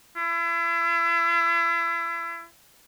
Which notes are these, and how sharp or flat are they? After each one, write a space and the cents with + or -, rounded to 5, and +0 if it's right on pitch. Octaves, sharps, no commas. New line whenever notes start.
E4 +35